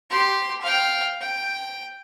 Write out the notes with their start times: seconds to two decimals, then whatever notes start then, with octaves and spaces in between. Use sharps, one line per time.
0.10 G4 C6
0.62 F5 G5
1.21 G5